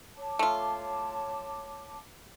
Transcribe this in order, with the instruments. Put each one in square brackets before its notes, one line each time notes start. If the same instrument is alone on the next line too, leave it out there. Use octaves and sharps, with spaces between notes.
[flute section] C#5 A5 D6
[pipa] A3 F4